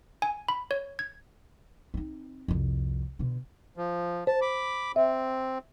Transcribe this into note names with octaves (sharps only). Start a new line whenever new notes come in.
G#5
B5
C#5
G#6
C4 D#4
C2 F2
B2 D3
F3
C5 A5
B5 D6
C4 E5